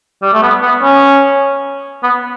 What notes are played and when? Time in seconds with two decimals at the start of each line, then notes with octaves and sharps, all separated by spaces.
0.22 G3
0.33 A3
0.42 B3
0.62 B3
0.83 C#4
2.03 B3